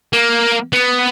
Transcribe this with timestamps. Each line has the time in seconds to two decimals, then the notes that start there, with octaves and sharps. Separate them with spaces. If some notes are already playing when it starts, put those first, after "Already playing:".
0.13 A#3
0.73 B3